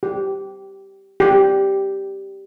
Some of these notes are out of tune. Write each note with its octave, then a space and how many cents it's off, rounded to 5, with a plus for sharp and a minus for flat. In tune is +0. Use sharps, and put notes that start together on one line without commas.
G4 -10
G4 -5